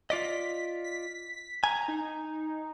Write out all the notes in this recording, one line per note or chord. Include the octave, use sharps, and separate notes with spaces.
F4 D5 D#5 B6
B6
G#5 A#5
D#4